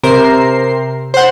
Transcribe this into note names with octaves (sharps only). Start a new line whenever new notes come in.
C3 A#4 C5 C7
C5 F#5